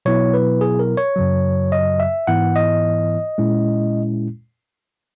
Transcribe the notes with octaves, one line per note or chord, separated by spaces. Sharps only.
B2 F#3 B3 E4 C#5
B4
G#4
A#4
C#5
F#2 C#3 F#3
D#5
E5
G#2 E3 B3 E4 F#5
D#5
A#2 G#3 C#4 E4